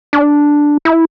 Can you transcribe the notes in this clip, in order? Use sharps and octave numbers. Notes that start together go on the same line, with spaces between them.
D4
E4